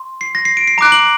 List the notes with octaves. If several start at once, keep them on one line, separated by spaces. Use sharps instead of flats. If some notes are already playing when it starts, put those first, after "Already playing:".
Already playing: C6
C7
A#6
C7
D7
C7
A#5 D6 F#6 D7
F#7